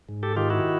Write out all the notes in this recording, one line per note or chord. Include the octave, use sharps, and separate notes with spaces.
G#2
G4 A4
D#3 F4 G4
E4 F#4